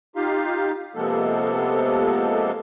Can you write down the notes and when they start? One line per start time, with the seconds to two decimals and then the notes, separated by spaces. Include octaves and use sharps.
0.16 D#4 F4 G4 F5
0.96 C3 F3 G#3 A#3 B3 A4